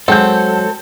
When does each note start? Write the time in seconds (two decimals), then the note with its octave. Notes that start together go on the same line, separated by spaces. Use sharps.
0.08 F#3 G#3 C4 A4 F#5 G6